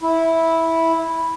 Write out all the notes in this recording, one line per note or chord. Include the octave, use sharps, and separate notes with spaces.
E4